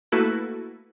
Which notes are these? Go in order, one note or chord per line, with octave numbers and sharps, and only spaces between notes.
A3 A#3 E4 F#4 A4 B4